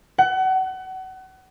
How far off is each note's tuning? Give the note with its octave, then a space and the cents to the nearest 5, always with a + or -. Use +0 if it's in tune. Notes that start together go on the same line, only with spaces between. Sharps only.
F#5 +30